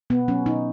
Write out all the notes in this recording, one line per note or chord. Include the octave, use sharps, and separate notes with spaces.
B2 B3
F#3 C#4
B2 D#4